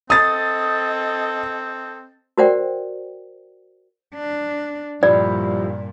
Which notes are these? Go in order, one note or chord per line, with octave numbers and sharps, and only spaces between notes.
C4 A4 D#5 D#6 A6
F#4 A#4 C5 D5 F#5 G5
D4
G2 A#2 F3 G3 E4 D5